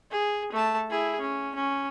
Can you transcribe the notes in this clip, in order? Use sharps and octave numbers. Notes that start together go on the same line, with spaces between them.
G#4
A3 A5
E4 G#4
C#4
C#4